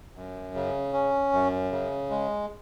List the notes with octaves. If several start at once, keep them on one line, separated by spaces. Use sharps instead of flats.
F#2
C#3
C#4
F#2
C#3
G#3